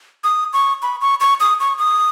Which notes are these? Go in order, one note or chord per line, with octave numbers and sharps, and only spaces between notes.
D#6
C#6
B5
C#6
C#6
D#6
C#6
D#6